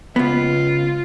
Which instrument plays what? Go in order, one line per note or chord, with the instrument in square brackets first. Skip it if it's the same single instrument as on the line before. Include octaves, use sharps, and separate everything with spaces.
[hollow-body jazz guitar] C#2 B3 [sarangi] F4